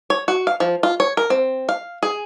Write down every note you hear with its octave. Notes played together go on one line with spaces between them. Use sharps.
C#5
F#4
F5
F3
F4
C#5
A#4
C4
F5
G#4